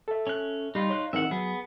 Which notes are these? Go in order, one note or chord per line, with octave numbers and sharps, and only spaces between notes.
A4 E5
C#4 F#6
G3 D#4 F4 B5 C6
C#5 C6 F#6
D#3 E3 C4 E5 F#5
F#3 B3 G#4